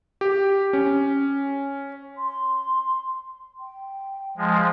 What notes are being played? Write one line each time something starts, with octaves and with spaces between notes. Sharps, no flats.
G4
C#4
C6
G5
F3 G#3